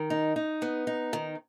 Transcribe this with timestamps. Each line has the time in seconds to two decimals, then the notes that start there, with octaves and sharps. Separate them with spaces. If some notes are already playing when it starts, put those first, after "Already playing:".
Already playing: D#3
0.10 D#4
0.36 D#4
0.62 B3
0.87 D#4
1.13 D#3